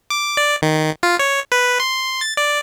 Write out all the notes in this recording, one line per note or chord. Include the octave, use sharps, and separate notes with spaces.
D6
D5
D#3
F4
C#5
B4
C6
A6
D5